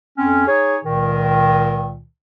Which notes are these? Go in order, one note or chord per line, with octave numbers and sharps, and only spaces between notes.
F2 C4 C#4
D#4 G#4 C#5
C#2 A#2 D#3